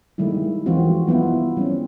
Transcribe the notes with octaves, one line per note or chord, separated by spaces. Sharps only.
D#3 G3 G#3 A#3 E4
E3 F3 G#3 C4 F4 F#4
G3 B3 E4 F4
G3 C4 C#4